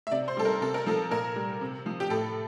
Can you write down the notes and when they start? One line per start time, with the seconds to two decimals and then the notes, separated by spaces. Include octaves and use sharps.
0.07 E5
0.11 C3 D5
0.28 C5
0.37 G3 A4
0.45 A#4
0.61 C3 A4
0.74 A#4
0.86 F3 A4
1.11 A#2 A#4
1.36 G3
1.61 C3
1.86 F3
2.00 G4
2.10 A2 A4